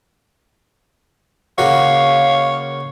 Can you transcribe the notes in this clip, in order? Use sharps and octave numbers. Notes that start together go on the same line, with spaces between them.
C#3 A#3 F#4 C#5 F5